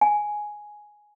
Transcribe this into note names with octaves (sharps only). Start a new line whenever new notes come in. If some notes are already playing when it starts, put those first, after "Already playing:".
G#5